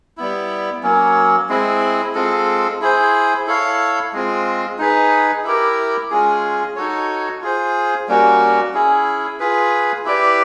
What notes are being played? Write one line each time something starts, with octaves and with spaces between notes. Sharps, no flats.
G3 B3 E4
F#3 A#3 C#4
G#3 C4 E4
G#3 C4 F4 A4
E4 G#4 C5
E4 A4 C#5 F5
G#3 C4 F4
D#4 G#4 B4
E4 G4 A#4
G#3 C#4 F4 G#4
D#4 F#4 A4 C#5
F4 G#4 C5
G3 A#3 C#4 F#4
C#4 E4 G#4
F4 G#4 B4
E4 G4 B4 D5